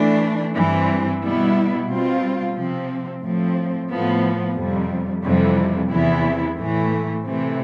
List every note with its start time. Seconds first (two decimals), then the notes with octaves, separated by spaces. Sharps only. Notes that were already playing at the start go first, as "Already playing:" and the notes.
Already playing: E3 A3 D4
0.54 G2 E3 G3 C4
1.21 B2 G3 B3 E4
1.87 B2 G3 C4 F4
2.54 C3 F3 C4
3.22 A2 F3 C4
3.89 A2 F3 B3
4.55 F2 C3 G3
5.22 F2 C3 E3 G3
5.90 E2 C3 E3 B3 E4
6.56 A2 E3 A3
7.23 C3 E3 A3 C4